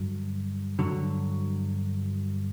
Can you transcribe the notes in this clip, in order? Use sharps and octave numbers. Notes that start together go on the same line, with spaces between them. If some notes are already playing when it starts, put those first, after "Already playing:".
Already playing: G2 D3 F#3
G2 D3 F#3